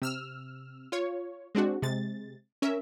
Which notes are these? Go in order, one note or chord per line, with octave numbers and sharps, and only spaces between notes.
C3 E6 F6
F4 C#5
G#3 C4 D4 F#4
C3 G#3 A6
C#4 A#4 E5